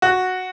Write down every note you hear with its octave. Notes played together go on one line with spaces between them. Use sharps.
F#4